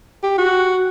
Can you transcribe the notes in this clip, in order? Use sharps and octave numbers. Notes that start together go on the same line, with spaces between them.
G4
F#4